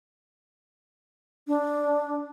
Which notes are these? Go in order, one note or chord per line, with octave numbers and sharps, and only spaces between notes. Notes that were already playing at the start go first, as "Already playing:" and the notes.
D4